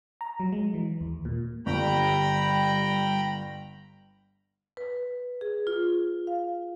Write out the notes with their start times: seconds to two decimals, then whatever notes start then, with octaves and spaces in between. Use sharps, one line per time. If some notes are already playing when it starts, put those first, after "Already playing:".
0.21 A#5
0.40 F#3
0.52 G#3
0.74 E3
1.01 D#2
1.25 A#2
1.66 G1 G3 G5 A#5 B5
4.77 B4
5.41 G#4
5.67 F4
6.27 F5